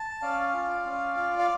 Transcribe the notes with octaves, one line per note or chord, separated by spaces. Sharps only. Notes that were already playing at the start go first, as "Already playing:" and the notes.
Already playing: A5
C#4 D5 F5
F4
C#4
F4
F5